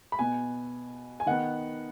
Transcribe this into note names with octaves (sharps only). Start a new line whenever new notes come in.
B5
B2 B3 G#5
G#5
D#3 B3 F#5